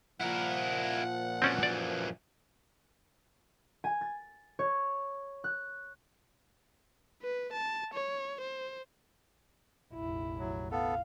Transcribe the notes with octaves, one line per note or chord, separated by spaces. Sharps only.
A#2 F3 E4 A#4 F#5
F#2 E3 C4 C#4 D5
D5
G#5
A6
C#5
F#6
B4
A5
C#5
C5
F1 A#1 E4
F#3
B3 A4 F5